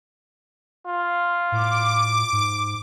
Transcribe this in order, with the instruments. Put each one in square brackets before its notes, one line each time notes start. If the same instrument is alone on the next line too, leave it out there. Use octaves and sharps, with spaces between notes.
[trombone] F4
[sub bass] A2 [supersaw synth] D6
[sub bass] G#2